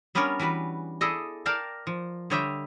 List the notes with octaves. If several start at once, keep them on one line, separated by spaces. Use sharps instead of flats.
G3 B3 C#4 D4 A#4 C#5
E3 G3 F#4 B4
E4 G#4 A4 D5 D#5
A#4 D5 F5 G5 A5 A#5
F3
D3 G3 C#5 D#5 E5 G5